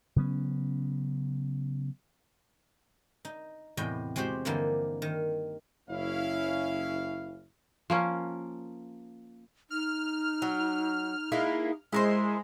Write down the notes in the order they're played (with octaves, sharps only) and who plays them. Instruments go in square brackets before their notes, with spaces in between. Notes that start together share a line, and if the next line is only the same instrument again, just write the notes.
[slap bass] C#3 F#3 B3 C#4
[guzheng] D#4
E2 A2 C3 D#5 G5
G#3 C4 F#4 G4 C5
G2 D3 E3 F3 A#3 D#4
D#3
[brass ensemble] F#1 C#4 E4 F5
[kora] F3 A#3 C#4
[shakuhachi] D#4 [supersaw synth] F6
[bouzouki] F#3
G#3 A#3 E4
[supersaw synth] G#3 [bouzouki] E4 A#4 C5